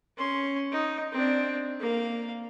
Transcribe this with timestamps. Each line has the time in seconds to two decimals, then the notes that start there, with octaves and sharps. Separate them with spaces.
0.17 C#4 C6
0.72 D#4
1.12 C4 D4
1.80 A#3 F5